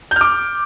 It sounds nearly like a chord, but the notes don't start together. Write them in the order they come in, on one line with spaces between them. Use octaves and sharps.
G6 F6 D6